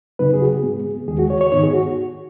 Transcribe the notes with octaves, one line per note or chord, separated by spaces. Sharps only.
F#2 C#3 F#3 B3 D#4 B4
G#4
F#4
G#4
G#2 G#3 B3
D#2 D#3 G#3 G#4
F#4
C#5
C#5
G#2 D#3 B3 D#4 C#5
G#4
F#4